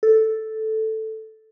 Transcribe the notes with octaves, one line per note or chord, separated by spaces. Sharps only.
A4